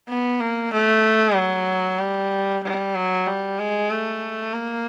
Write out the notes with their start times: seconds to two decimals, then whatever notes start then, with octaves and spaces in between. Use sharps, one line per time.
0.09 B3
0.40 A#3
0.73 A3
1.36 F#3
2.00 G3
2.64 G3
2.95 F#3
3.27 G3
3.59 G#3
3.90 A3
4.54 A#3